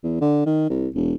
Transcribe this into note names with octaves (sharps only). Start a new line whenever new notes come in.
E2
D3
D#3
C2
E1